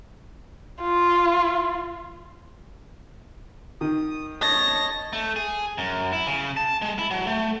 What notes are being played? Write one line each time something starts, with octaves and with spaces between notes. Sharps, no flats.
F4
D#3 D#6
C#5 D#5 A5 A#6
A3
G#4
F#2
E4
C#3
A5
G#3
E4
F#3
A3